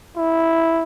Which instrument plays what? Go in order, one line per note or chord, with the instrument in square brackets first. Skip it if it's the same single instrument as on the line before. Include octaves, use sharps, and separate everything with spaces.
[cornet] E4